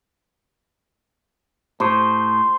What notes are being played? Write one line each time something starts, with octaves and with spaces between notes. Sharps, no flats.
A2 C5